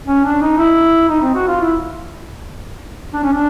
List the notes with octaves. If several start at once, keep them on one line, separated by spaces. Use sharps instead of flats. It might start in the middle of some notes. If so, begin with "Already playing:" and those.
C#4
D4
D#4
E4
D#4
C4
F#4
F4
E4
D4
C#4
D4